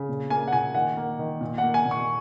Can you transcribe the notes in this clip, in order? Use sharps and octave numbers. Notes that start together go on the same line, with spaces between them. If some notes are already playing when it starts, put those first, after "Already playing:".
Already playing: C#3
A#2
A#3 G#5
F#5
A#2 G#5
D#3 F#5
A#3
D#3
A#2
F#5
A#3
G#5
A#2
C#6